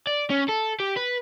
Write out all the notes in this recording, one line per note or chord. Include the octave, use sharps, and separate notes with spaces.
D5
C#4
A4
G4
B4